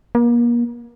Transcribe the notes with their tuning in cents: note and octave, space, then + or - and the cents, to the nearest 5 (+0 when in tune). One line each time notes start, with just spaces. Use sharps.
A#3 +35